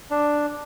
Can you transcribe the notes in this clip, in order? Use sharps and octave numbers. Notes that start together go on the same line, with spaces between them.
D4